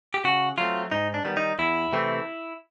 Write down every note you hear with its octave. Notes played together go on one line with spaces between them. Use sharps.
G4
C#3 F#4
F#3 A3 C4 F4
G#2 D#4
D4
D#3 G3 B3
D#4
E2 E4
C3 E3 A3 C4